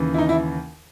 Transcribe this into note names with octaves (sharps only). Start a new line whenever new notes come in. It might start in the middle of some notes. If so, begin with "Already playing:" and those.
Already playing: D#2 C#3 E3
E4
D#4
E4